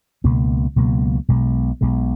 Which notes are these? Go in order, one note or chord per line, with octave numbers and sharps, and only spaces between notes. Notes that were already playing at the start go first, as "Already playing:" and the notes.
C#2 B2 F#3 A#3
C#2 B2 F#3 A#3
B1 B2 G#3
B1 B2 G#3